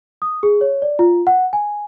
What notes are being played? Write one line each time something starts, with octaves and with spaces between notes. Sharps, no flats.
D#6
G#4
C#5
D5
F4
F#5
G#5